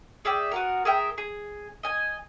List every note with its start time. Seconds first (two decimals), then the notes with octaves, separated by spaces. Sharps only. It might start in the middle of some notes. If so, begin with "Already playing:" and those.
0.25 G#4 D5 E5 G5
0.52 B3 F#4 A#4
0.85 G#4 A#4 E5 G5
1.18 G#4
1.83 D#5 G#5